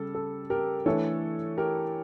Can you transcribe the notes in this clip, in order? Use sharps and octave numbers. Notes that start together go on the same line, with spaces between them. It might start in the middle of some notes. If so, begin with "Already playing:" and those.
Already playing: C#3 G3 A4
A4
G4 A#4
E3 A3 D4 A4 C#5
G4 A#4